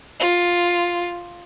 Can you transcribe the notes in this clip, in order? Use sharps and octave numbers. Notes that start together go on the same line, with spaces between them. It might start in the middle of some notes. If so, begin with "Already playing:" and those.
F4